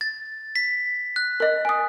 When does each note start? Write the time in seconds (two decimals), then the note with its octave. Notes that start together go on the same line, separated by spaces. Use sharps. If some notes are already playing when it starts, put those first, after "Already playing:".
0.01 A6
0.56 B6
1.16 F#6
1.40 A#4 D#5
1.65 G#5 D#6